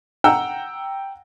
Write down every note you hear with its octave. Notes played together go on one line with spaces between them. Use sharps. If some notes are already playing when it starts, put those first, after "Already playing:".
F#5 G5 A#5 E6